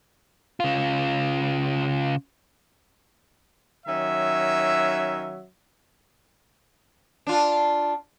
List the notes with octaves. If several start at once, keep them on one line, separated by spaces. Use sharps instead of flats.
C#3 F4
D#3 F#3 C#4 E5
D4 F4